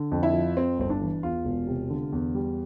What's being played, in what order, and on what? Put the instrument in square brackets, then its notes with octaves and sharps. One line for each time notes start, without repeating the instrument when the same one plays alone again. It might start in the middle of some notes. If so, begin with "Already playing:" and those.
Already playing: [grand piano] D3
F2
[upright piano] E4
[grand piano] F3
[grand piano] F2 [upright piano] C4
[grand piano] G1 [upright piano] C4
[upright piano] D4
[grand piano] E3
[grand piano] E2 [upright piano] F4
[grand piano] E1
C3
D3
E2
G3